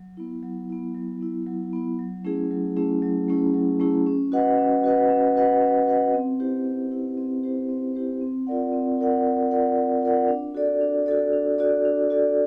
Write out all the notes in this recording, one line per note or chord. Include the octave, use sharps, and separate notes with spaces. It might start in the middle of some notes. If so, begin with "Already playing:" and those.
Already playing: F#3
B3 E4
F#3
B3 E4
F#3
B3 E4
F#3
B3 E4
F#3
A3 C#4 E4 G#4
F#3
A3 C#4 E4 G#4
F#3
A3 C#4 E4 G#4
F#3
A3 C#4 E4 G#4
C#4
F#4 B4 D#5 F#5
C#4
F#4 B4 D#5 F#5
C#4
F#4 B4 D#5 F#5
C#4
F#4 B4 D#5 F#5
C4
E4 G4 C5
C4
E4 G4 C5
C4
E4 G4 C5
C4
E4 G4 C5
C4
F4 A#4 D5 F#5
C4
F4 A#4 D5 F#5
C4
F4 A#4 D5 F#5
C4
F4 A#4 D5 F#5
D4
F#4 A4 D5
D4
F#4 A4 D5
D4
F#4 A4 D5
D4
F#4 A4 D5